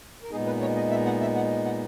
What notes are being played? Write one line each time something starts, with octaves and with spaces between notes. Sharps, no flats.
A#4
A#2 G#3 B3 D#4 G#4
B4
C#5
D#5
E5
F#5
E5
F#5
F#5